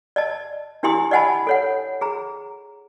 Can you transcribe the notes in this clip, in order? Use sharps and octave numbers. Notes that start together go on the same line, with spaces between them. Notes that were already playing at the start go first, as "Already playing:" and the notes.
D5 D#5 A5
D4 E4 G4 G#5 C6 D#6
D5 D#5 F#5 G#5 A5 B5
A4 C#5 F#5
G#4 A#5